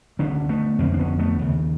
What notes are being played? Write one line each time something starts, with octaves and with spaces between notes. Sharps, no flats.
D2 D3 B3 C#4
A3 B3
F2 D3 A#3 C4
D4
B3 C#4
A3 B3
D#2 C#3